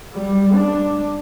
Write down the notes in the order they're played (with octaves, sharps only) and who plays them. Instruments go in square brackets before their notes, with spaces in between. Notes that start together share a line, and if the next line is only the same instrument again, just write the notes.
[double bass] G3
D4